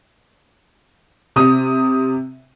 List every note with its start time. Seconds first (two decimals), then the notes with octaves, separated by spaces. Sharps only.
1.36 C3 D#6